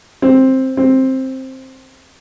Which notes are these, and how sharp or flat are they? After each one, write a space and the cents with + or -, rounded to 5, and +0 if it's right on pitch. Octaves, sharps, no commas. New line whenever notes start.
C4 +10
C4 +10